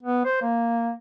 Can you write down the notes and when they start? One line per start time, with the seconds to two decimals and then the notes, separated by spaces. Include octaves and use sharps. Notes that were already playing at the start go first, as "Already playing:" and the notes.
0.03 B3
0.25 C5
0.42 A#3